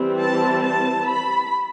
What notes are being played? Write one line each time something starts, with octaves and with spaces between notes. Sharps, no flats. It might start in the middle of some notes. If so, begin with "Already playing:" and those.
Already playing: E3 G3 C4
A5
A5
B5